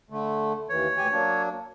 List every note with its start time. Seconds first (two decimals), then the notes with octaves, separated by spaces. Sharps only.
0.10 D3 A3
0.69 D#2 E3 C#5
0.97 D2 G4 G#5
1.11 F#3 A#3 D4